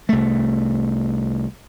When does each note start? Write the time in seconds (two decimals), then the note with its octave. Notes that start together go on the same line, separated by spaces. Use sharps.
0.09 C2 A3